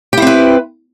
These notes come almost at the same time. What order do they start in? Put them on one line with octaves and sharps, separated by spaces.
G4 E4 C4 B4